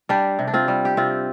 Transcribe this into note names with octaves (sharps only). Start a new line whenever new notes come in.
G3 D4 G4
C3
D4
C4 F4
G3
G4
C3 C4 F4